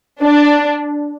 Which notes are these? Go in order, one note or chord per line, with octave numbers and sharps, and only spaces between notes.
D4